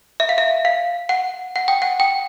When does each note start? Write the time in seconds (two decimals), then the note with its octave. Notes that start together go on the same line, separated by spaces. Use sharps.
0.20 E5
0.29 F5
0.38 E5
0.65 F5
1.09 F#5
1.56 F#5
1.68 G5
1.82 F#5
2.00 G5